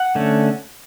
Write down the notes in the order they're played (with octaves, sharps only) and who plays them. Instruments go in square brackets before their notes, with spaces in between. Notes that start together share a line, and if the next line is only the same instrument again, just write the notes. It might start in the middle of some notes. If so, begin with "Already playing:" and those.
Already playing: [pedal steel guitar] F#5
D3 A3 C#4